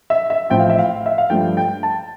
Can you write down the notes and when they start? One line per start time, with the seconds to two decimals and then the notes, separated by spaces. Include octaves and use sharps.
0.10 E5
0.30 E5
0.50 A1 A2 F3 C4 E4 G5
0.60 F5
0.70 E5
0.79 F5
1.06 E5
1.18 F5
1.30 G2 F3 A3 G5
1.57 G5
1.83 A5